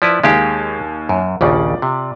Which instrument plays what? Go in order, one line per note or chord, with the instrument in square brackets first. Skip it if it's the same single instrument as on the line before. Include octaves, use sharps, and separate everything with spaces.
[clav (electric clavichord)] F3 E4 B4 [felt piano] D5
[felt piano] D#2 F5 G#5 [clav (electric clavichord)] G#3 G4
[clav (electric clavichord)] F#2
[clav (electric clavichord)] A#1 D#2 C#3 [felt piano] F4 D5 D6
[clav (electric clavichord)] C3